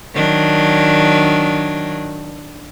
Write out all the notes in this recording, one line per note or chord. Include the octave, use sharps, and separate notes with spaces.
D#3 F#3 D4